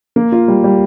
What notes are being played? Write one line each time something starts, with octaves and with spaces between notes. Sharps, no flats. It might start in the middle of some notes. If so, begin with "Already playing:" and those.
A#3
F4
G3
G3